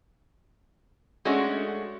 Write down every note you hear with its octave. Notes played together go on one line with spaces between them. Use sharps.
G#3 A3 C#4 D4 F#4